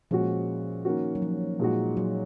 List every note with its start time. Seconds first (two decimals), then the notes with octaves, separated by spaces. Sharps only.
0.11 A#2 F3 G#3 C#4 F#4
0.85 D#3 A#3 C#4 F#4
1.15 F#3
1.22 F3
1.59 A#2 G#3 D#4 F#4
1.97 F#3